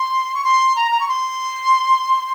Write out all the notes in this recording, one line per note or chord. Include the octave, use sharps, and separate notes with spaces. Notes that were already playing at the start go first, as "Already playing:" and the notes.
Already playing: C6
C#6
C6
A#5
A#5
C#6
C6